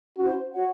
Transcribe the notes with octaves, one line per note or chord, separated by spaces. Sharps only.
C#4 E4 F#4 C5
F#4 C#5 F#5